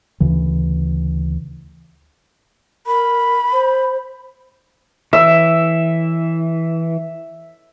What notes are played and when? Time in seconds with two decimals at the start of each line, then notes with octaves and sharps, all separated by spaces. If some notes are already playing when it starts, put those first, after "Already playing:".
0.20 D2 C#3 E3
2.86 A#4 B5
3.53 C5
5.13 E3 E5